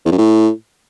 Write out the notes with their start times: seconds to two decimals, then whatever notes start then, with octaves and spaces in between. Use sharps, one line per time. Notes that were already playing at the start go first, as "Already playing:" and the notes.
0.05 E2
0.12 F#2
0.18 A2